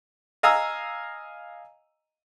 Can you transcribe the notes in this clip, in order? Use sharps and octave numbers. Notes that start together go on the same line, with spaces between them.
D#5 F5 G#5 A#5 D#6 E6